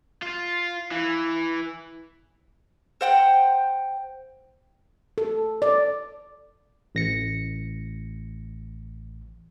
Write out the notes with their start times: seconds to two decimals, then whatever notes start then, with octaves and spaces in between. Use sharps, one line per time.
0.22 F4
0.92 E3
3.01 C5 F#5 G5
5.18 A4
5.62 D5
6.95 A1 A#6 C#7